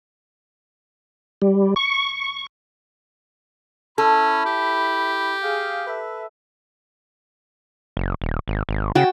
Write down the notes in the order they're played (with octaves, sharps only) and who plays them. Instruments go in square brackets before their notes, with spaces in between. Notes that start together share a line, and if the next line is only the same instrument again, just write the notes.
[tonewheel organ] G3
C#6
[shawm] C#4 [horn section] E4 B5 [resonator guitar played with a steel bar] A4
[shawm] G4
[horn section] G#4 F5
A4 B4 E5
[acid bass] F#1
D#1
G#1
G#1
[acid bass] C#3 [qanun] F#4 G5 A5